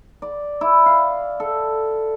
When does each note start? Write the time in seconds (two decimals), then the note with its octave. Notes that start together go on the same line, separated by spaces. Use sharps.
0.22 D5
0.61 E4
0.86 F5
1.40 A4